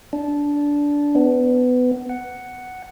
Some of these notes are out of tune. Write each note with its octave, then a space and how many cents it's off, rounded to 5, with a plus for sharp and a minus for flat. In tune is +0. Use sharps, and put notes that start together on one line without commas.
D4 -15
B3 +20
F#5 +5